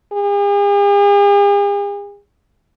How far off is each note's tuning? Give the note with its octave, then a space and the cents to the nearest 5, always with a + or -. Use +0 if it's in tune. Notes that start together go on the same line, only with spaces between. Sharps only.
G#4 -45